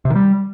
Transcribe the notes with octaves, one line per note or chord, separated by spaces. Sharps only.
C3
D#3
G3